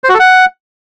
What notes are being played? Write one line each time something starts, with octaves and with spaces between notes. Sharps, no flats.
C5
F#4
A4
F#5